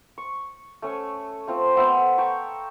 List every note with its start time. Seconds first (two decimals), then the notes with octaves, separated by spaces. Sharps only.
0.18 C#6
0.82 A3 C#4 G#5 C#6
1.47 A3 C4 F4
1.76 B3 C5 E5 B5
2.18 G5 A5 A#5 C#6